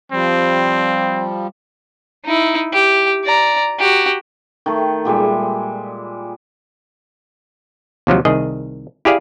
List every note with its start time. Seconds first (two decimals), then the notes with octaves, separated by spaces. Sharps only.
0.12 F3 G3 C4
2.25 D#4 E4
2.73 G4
3.25 D5 A#5
3.79 F#4 G4
4.66 D#3 A3
5.05 A#2 G3 G#3 E5
8.07 D#2 C3 F3 F#3
8.25 C2 D#3 G#4 D#5
9.05 E4 G4 G#4 D5 F5